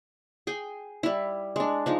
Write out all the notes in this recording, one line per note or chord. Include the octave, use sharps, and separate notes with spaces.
G#4 G5 G#5
G3 E4
G#3 D4
F3 G#3 D#4